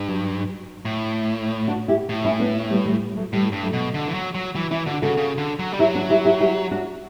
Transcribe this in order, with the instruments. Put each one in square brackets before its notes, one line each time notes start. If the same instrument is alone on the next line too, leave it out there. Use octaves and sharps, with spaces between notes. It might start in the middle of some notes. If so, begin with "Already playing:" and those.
Already playing: [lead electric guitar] G2
[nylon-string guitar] F#3
[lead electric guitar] A2
[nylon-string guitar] D4 F#4
E4 G4
[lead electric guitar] A2
[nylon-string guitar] C#4 E4
B3 D4
G3 B3
E3 G3
G3
F#3 A3
[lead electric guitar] A2 [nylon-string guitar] E3 G3
[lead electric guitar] G2
[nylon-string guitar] F#3 A3
[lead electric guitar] B2
D3
E3
F#3
F#3
[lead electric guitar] E3 [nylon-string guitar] F#3
[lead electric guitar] E3 [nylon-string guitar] C#4 E4
[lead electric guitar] D3 [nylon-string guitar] D4 F#4
[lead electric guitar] C#3 [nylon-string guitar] F#4 A4
[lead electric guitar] C#3
D3
F#3
G3
[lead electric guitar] F#3 [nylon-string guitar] E4 G4
[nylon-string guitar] D4 F#4
E4 G4
E4 G4
E4 G4
D4 F#4